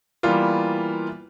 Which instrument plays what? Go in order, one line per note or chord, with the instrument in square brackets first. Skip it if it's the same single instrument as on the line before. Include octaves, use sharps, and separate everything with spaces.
[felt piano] E3 G3 A#3 B3 F4